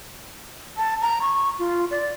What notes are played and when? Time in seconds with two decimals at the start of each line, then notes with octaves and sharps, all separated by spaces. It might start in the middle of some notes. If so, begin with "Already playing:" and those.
0.77 A5
1.02 A#5
1.22 C#6
1.59 F4
1.91 D5